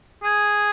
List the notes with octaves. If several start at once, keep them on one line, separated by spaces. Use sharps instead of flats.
G#4